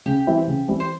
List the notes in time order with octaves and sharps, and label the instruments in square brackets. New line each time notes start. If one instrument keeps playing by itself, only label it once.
[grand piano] C#3 [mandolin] G4
[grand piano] E3 G3 C4 E4
C#3
E3 G3 C4 E4
[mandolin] C5